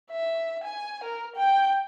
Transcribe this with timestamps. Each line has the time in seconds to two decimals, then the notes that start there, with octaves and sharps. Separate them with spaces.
0.11 E5
0.64 G#5
1.04 A#4
1.36 G5